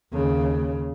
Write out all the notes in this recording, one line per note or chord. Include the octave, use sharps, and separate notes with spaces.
D#2 C#3